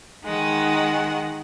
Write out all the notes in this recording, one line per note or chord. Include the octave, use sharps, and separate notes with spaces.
D#3 G#3 F#5